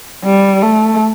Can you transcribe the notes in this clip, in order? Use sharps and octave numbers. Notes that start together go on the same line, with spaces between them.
G3
A3